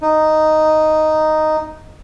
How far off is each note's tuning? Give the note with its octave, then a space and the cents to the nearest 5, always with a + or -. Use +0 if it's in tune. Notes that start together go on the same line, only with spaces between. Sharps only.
D#4 -5